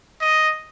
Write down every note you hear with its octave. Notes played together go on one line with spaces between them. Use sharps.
D#5